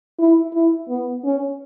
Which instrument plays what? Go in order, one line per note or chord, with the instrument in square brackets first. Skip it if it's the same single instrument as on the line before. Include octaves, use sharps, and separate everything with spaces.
[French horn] E4
E4
B3
C#4